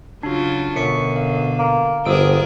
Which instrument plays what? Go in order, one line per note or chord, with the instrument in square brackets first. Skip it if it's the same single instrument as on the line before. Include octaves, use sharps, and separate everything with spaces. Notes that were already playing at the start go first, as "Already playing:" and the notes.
[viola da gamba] C#3 F#3 F4 [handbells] D4 F#4
[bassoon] F#2 [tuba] B2 [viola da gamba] D3 [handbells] C#6 B6 C#7
[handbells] F5
[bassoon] A#3
[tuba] G1 [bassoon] F3 [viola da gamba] D4 G#4 A#4 [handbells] D#6 E6 D7